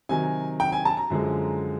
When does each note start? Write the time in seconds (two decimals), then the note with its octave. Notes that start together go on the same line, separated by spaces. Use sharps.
0.09 C3 D#3 F#3 G#5
0.60 G5
0.72 G#5
0.85 A5
0.97 A#5
1.10 F#2 D3 F3 G#3